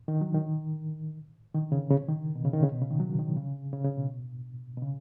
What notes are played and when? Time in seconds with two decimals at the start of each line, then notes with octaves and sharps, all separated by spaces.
0.08 D#3
0.21 F#3
0.34 D#3
1.54 D#3
1.72 C#3
1.91 C#3
2.08 D#3
2.36 B2
2.45 C#3
2.54 D#3
2.63 C#3
2.72 B2
2.81 C#3
2.91 D#3
3.00 F#3
3.19 D#3
3.36 C#3
3.73 C#3
3.85 C#3
3.97 B2
4.77 B2
4.82 C#3